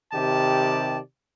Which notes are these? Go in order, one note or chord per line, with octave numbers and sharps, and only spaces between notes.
C3 D#3 G4 D5 A5